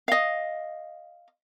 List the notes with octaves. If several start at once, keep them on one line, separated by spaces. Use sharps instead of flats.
D#5 F5